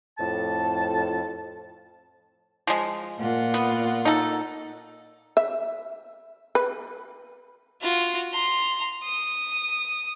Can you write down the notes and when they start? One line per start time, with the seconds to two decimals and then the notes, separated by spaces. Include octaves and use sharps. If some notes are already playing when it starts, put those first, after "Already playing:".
0.18 F2 A2 A5
2.67 F3 G#3
3.19 A#2 F4 F#5
3.54 B3
4.05 D#4 A4
5.37 E5
6.55 B4
7.82 F4 F#4
8.33 A#5 C6
9.04 D#6